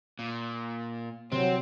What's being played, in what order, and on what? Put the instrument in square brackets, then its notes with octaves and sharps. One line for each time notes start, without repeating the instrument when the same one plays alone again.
[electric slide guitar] A#2
[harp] C3 [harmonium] F#3 [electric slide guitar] C4